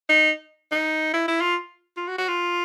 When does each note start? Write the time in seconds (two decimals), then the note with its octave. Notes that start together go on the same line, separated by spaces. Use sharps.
0.09 D#4
0.72 D#4
1.14 E4
1.28 E4
1.41 F4
1.97 F4
2.08 F#4
2.18 F#4
2.28 F4